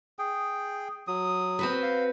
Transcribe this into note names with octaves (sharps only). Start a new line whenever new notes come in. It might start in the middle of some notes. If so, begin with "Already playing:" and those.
G#4 G5
F#3 D#6
C4 F#4 B4
F5